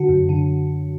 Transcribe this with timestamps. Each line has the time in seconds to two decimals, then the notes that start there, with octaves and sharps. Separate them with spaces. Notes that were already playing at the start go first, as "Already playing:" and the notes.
Already playing: D3 F#4
0.09 F#2
0.29 D3